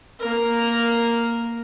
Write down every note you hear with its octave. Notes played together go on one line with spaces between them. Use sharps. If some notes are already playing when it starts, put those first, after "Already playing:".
A#3 A#4